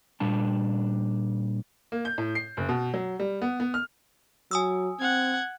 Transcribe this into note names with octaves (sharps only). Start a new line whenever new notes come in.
A#2 G3 D4 A5
A#3
G6
A2
C7
F#1
B2
F#3
G3
B3
B3
F6
F#3 G#5 D#6 E6
C4 F#5 G#6